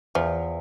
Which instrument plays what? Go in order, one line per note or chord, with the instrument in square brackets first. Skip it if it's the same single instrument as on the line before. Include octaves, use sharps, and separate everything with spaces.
[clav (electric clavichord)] E2 [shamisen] F3